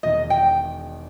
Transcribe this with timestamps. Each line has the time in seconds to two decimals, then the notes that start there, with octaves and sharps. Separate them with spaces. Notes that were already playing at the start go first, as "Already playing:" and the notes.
0.03 E1 E2 D#3 D#5
0.30 G5